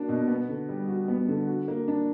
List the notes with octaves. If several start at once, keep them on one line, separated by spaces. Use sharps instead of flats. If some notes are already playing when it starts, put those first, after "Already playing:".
Already playing: A#3 D4 F#4
B2
B3
D3
G3
F#4
B3
D3
F#4
A#3
D4